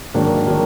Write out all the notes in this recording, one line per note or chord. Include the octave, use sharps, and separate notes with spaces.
G#2 D#3 F#3 A#3 D4
D#3 F#3 A#3 D4